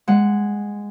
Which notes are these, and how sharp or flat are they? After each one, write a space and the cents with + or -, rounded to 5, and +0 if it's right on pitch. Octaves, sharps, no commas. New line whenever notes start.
G#3 -10 F#5 +0